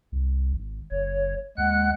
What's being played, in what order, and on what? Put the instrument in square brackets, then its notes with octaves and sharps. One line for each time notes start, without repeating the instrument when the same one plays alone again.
[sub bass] C2
G#1
[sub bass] F#1 [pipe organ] C#5
[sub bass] D#2 [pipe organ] G#3 F#5 F#6